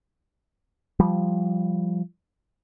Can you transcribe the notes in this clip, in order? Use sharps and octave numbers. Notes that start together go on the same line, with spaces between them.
F3 G3